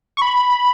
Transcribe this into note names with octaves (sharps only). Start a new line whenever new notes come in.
C#6
B5